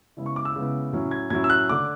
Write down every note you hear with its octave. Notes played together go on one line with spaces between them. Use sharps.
C#3 G#3 B3 E4
C#6
D6
E6
C#3 G#3 B3 E4
A2 F#3 C#4 E4
G#6
A2 F#3 C#4 E4 G#6
E6
F#6
D3 A3 D6